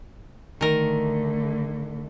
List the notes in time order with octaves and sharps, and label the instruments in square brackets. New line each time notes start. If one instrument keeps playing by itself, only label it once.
[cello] D3 A3 [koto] D#3 A#4